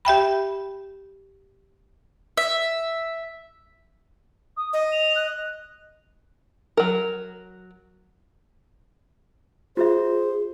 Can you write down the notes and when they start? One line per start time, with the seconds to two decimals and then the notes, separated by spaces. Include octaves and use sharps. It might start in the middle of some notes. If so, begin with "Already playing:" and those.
0.05 G4 E5 G5 B5
2.37 E5
4.57 D#6
4.73 D#5
4.92 F7
5.16 F#6
6.77 F#3 A#4
9.77 F4 F#4 G#4 C5 E5